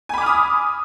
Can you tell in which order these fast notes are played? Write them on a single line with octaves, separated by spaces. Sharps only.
G#5 B5 D6 F6 D#6